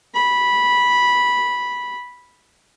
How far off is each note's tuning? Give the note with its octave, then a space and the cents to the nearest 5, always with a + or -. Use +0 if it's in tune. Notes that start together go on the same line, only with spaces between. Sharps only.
B5 -10